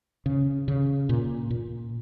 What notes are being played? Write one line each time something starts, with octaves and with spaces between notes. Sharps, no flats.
C#3
C#3
A#2
A#2